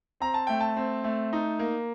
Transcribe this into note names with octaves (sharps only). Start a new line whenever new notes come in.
C4 A#5
A5
A3 G5
A5
C4
A3
D#4
A#3